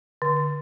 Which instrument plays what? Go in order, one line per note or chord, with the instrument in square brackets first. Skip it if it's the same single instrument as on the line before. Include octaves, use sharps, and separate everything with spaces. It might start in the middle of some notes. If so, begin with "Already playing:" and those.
[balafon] D3